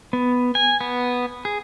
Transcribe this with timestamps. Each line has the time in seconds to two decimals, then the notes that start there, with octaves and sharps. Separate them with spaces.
0.13 B3
0.55 G#5
0.81 B3
1.45 G#4